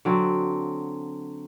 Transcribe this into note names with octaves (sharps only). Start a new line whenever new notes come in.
D3 F#3 C4